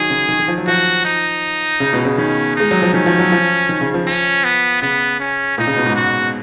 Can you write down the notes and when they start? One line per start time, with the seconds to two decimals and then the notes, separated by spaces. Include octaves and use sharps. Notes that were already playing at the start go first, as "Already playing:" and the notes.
Already playing: D#3 F#3 G#4
0.10 C#3
0.29 D#3
0.39 D#3
0.48 F3
0.58 F#3
0.67 F3 F#4
1.05 D#4
1.80 C#3
1.93 B2
2.05 C#3
2.18 D#3 C#4
2.56 G#3 D#4
2.71 F#3
2.82 F3
2.93 D#3 C#4
3.06 F3
3.19 F#3
3.32 F3
3.69 D#3
3.81 C#3
3.94 F3
4.07 C#4
4.44 B3
4.82 C#3 B3
5.20 C#4
5.58 A#2 D#4
5.67 C#3
5.76 B2
5.86 G#2
5.96 F#4